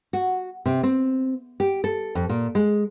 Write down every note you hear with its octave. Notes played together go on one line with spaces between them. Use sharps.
F#4
C3
C4
G4
A4
F2
A#2
G#3